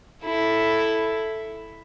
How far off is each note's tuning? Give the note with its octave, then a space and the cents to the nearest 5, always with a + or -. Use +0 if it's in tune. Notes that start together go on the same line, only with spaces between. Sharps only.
E4 +0 A4 +0